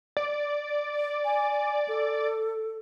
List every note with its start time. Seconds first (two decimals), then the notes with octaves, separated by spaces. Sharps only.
0.17 D5
1.25 G#5
1.88 A4